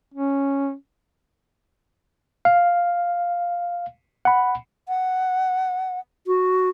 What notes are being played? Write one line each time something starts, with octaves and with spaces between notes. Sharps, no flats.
C#4
F5
F#5 B5
F#5
F#4